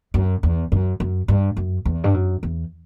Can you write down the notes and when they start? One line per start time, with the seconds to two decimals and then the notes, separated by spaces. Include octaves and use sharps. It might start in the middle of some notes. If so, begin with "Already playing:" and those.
0.14 F#2
0.43 E2
0.72 F#2
1.00 F#2
1.28 G2
1.57 F#2
1.85 E2
2.04 G2
2.14 F#2
2.43 E2